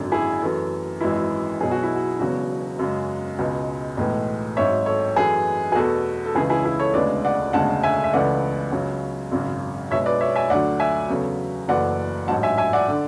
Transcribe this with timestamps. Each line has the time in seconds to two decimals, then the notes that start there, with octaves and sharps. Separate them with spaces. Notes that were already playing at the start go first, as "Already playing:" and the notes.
Already playing: G#1 F#2 D3
0.12 E4 G#4
0.42 F#2 E3 A3
1.01 G#1 F#2 E3 G#3 E4
1.60 B1 B2 F#3 G#4
1.71 F#4
1.83 E4
1.95 F#4
2.20 E1 E2 C#3 F#3 F#4
2.79 F#2 C#3 G#3
3.38 C#2 B2 G#3
3.97 B1 A2 E3 G#3
4.57 G#1 G#2 F#3 C#5 E5
4.86 A4 C#5
5.16 F#2 E3 A3 G#4 B4
5.72 G#4
5.75 E2 B2 A3 F#4 A4
6.26 A4
6.35 C#2 C#3 E3 E4 G#4
6.50 E4 G#4
6.65 E4 G#4
6.80 A4 C#5
6.94 E1 D2 C#3 G#3 B4 D5
7.25 D5 F#5
7.53 E1 D2 C#3 G#3 F#5 A5
7.83 E5 G#5
8.04 E5
8.13 C#2 C#3 E3 A3 D5 F#5
8.72 C#2 C#3 F#3
9.32 G#1 F#2 C#3 F#3
9.91 B1 B2 G#3 C#5 E5
10.06 B4 D5
10.21 C#5 E5
10.36 E5 G#5
10.50 D2 D3 F#3 D5 F#5
10.80 E5 G#5
11.10 E2 C#3 F#3 A3
11.68 F#1 F#2 E3 A3 D5 F#5
12.28 A1 G#2 F#3 F#5 A5
12.43 E5 G#5
12.57 E5 G#5
12.73 D5 F#5
12.88 D3